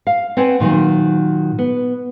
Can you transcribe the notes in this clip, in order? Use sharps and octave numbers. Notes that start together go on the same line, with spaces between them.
F5
C4 B4 C#5 D5 F#5 G#5
A#2 D#3 F3 F#3
B3